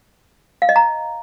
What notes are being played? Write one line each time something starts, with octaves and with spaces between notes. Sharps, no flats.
F5
D#5
A#5